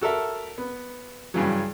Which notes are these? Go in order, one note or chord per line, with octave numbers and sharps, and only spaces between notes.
F#4 A4 A#4 E5
B3
G2 C#3 E3 F#3